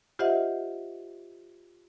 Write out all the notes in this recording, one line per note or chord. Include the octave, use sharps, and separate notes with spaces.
F4 G4 C5 D#5 E5 F#5